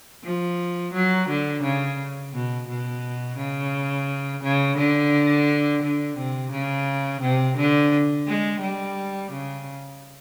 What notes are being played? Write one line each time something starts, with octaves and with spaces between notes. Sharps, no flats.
F3
F#3
D3
C#3
B2
B2
C#3
C#3
D3
D3
C3
C#3
C3
D3
G#3
G3
C#3